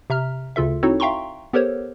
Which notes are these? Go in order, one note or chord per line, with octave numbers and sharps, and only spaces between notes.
C3 E5 A#5 F6
D2 C#3 F4 A4 E5
C4 D#4 E4 F#4 A4 C#5
E5 F5 G5 A#5 C6 C#6
B3 G4 A4 A#4 C5 C#5